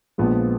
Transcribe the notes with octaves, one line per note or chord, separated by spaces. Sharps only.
A#1 A#2 F3 G#3 B3